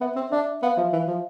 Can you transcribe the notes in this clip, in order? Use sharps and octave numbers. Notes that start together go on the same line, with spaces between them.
B3 E5
C4
D4 E5
B3 F5
F3 E5
E3
F3